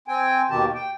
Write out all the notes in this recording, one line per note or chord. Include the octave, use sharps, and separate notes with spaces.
C4 G5 G#5
D#2 B2 D#3 G4 A5
G5